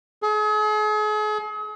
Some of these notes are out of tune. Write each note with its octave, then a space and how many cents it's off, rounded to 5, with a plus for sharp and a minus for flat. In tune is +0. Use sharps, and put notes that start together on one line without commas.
G#4 +40